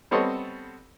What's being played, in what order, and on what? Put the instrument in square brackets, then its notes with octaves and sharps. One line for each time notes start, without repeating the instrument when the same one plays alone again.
[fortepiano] G3 B3 C4 A4 C#5 D#5